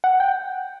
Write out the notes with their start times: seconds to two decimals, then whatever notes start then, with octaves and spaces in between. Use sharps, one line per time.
0.04 F#5
0.20 G5